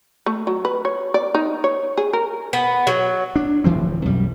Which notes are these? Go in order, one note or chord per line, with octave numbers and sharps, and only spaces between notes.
A3
F#3
B4
C#5
D5
D#4
C#5
G#4
A#4
B3
F#3
D4
D1 E3 F3 C4
B1 F#2 G3